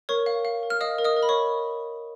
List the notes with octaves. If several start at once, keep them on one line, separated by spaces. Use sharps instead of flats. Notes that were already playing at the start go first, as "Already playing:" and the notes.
A#4 C#5 C#6
F5
F5
A#4
F6
D#5 F5 D#6
A#4
D#5 D#6
A#4
B5
C#5 C#6